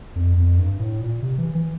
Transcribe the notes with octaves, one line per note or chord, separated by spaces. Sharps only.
F2
F2
G2
A2
A#2
C3
E3
E3